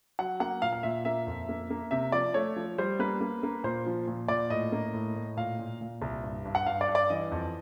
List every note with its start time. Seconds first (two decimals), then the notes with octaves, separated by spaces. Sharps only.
0.19 F#3 F#5
0.40 A#3 F#5
0.62 A#2 F5
0.73 F5
0.83 A#2 E5
1.05 A#3 E5
1.27 F2
1.49 A#3
1.70 A#3
1.91 C3 E5
2.12 F3 D5
2.34 A3 C#5
2.56 F3
2.78 G3 C5
2.99 A#3 B4
3.21 A#3
3.43 A#3
3.64 A#2 C5
3.86 F3
4.08 A#2
4.28 A#2 D5
4.50 A2 D#5
4.72 A#3
4.94 A2
5.16 A2
5.37 A#2 F5
5.59 A#2
5.81 A#2
6.02 C2
6.23 G2
6.45 G2
6.55 F#5
6.66 G2 F5
6.81 D5
6.88 G2
6.95 D5
7.10 E3 D#5
7.32 F2